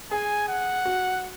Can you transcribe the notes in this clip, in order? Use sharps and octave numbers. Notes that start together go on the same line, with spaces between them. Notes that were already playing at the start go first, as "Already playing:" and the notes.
G#4 G#5
F#5
F#4